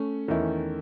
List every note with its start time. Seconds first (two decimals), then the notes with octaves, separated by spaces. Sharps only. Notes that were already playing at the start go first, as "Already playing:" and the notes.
Already playing: A3 C#4
0.28 E2 D#3 A3 C#4 E4